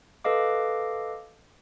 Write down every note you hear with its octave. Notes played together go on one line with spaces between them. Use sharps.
A4 B4 D#5 F5 D6